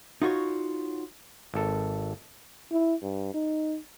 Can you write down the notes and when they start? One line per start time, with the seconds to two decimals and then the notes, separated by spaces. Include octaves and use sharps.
0.22 D#4 F4 F#4 C#5
1.54 G#1 A4
2.72 E4
3.02 G2
3.34 D#4